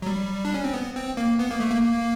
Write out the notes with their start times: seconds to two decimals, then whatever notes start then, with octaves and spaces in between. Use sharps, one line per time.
0.02 F#3
0.06 G3
0.45 D4
0.54 C#4
0.64 C4
0.74 B3
0.95 C4
1.17 A#3
1.39 B3
1.50 A#3
1.60 A3
1.71 A#3